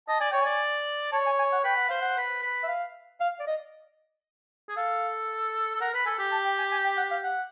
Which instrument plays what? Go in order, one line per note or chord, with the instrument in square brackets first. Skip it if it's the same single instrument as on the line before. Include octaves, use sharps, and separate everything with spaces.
[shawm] D#5 [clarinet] A5
[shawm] D5 [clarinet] G#5
[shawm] C#5 [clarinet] G5
[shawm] D5 [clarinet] G#5
[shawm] C#5 [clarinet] A5
[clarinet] G#5
G#5
F#5
[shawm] B4 [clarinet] G5
[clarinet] F#5
[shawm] C5 [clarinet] F5
[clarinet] F#5
[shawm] B4
B4
[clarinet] E5
F5
F5
D5
D#5
[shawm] G#4
[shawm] A4 [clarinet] F5
[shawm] A4
[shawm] A#4 [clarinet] F#5
[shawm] B4
[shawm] A4 [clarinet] G#5
[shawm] G4
[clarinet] A5
G5
G#5
G#5
G5
F#5
F5
F#5